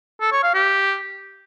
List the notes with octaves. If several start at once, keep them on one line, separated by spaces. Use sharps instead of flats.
A4
C#5
F5
G4